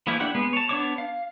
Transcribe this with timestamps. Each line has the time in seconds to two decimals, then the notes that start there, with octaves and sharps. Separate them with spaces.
0.07 E3 F3 A3 A#3 E4
0.20 D4 E4 G4 F#5
0.35 G#3 B3
0.53 C#5 A5
0.69 B3 D4 C#5 D6
0.98 F5